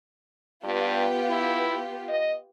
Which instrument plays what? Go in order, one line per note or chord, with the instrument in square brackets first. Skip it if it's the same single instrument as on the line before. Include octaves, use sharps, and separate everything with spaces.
[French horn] G2 [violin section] B3 F4 G4
[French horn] E4
D#5